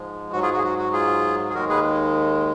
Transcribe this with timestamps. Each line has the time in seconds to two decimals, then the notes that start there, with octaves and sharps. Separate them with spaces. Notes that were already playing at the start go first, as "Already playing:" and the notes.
Already playing: G#2 F3 G#3
0.32 G#2 F#4
0.35 F#3
0.42 F4 G#4
0.53 F#4
0.58 G#4
0.64 F#4
0.78 F#4
0.93 F4 G#4
1.50 G#4
1.54 D#2 D#3 G#3 F#4 A#4
1.69 G#4 B4